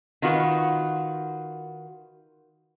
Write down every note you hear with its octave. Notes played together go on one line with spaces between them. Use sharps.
D#3 F4 F#4 B4